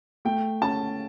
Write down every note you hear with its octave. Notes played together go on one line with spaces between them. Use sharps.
A3 G5
C#4 A5